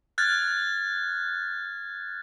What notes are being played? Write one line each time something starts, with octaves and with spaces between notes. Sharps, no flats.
F6 F#6 G#6 A6